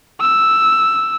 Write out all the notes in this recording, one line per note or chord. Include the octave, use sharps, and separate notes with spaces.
E6